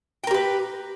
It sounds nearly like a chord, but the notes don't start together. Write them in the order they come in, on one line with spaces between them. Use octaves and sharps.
G5 A#4 G4 B4